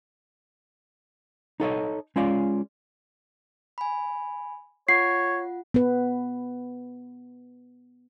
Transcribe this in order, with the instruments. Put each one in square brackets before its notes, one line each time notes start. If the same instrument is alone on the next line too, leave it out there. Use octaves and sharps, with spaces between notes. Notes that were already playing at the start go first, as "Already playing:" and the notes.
[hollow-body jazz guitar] D#4 A4 C#5 D#5
G#3 C#4 F4 D5 F5
[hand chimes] G#5 B5
[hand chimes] F4 F#5 [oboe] C#5 [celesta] C7
[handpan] B3 B4